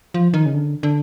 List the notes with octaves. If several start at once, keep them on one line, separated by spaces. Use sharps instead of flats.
F3
D#3
C#3
D3
D3